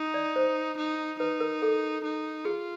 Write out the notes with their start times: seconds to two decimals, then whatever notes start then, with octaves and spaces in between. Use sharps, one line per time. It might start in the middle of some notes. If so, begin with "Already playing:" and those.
Already playing: D#4
0.14 D5
0.36 C5
0.78 D#4
1.19 D#4 B4
1.40 A#4
1.62 A4
2.04 D#4
2.45 F4 G#4